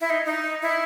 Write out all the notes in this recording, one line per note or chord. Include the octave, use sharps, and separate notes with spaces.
E4
D#4
D#4
E4